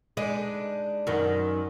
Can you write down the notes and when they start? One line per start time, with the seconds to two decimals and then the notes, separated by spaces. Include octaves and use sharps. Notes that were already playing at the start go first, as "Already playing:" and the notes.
0.17 G#3 D4 D#4 B4
1.07 F#2 D#3